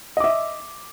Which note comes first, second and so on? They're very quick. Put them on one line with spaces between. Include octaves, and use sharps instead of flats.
D#5 D6 E5